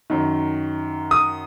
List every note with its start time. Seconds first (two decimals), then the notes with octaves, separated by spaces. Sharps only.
0.10 F#2 D#3
1.11 D#6